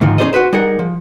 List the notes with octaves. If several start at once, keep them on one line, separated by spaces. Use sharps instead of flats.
D2 G#2 D#3 F3
C#4 D#4 G#4 C5 D5 D#5
F#4 G#4 B4 C5
G3 D#4 G#4 A#4 F#5
F3